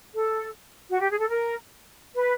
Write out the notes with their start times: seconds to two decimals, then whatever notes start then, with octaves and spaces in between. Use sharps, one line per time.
0.14 A4
0.91 F#4
1.01 G4
1.10 G#4
1.19 A4
1.29 A#4
2.15 B4